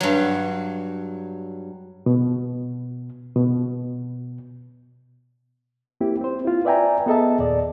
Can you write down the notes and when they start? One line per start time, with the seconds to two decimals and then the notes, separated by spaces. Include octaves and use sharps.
0.01 G2 F#3
2.06 B2
3.36 B2
6.01 A#3 C4 E4 G4
6.21 C4 C5
6.45 E4 F4
6.65 B4 D5 E5 G5 G#5 A#5
7.06 B3 G#4 A4 D#5 E5 A5
7.39 D#2 A#2 D5